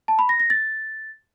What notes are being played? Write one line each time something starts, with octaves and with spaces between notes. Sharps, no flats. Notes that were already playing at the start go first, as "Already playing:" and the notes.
A5
B5
A#6
A#6
A6